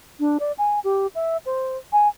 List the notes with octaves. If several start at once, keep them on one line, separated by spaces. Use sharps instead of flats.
D4
D5
G#5
G4
E5
C5
G#5